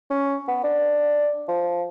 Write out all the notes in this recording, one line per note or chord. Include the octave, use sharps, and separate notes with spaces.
C#4
B3
D4
F3